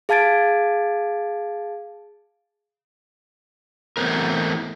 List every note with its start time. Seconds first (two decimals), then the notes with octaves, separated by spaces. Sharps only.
0.09 G#4 F5 A5 G#6 A6 D7
3.97 E3 A3 B3 C4 A#4